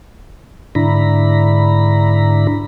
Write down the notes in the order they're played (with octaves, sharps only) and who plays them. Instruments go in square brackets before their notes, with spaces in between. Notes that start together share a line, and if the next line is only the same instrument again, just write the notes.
[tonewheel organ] G#2 D3 D4 E4 A#5 B5